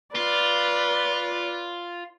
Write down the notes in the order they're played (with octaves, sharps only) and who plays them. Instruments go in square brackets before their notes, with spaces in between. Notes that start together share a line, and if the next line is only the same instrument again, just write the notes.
[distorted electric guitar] F4 [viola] B4 D5